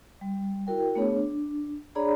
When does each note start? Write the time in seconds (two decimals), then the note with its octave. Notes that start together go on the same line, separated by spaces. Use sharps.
0.21 G3
0.67 E4 F#4 A#4 G5
0.95 A3 B3 D4 G#4 C#5
1.16 D4
1.95 D4 G#4 C#5 D5 A#5 B5